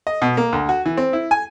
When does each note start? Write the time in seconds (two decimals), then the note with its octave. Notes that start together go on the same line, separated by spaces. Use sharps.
0.07 D#5
0.22 B2
0.37 A#3
0.53 D2
0.69 F#4
0.86 E3
0.97 C4
1.13 E4
1.31 G#5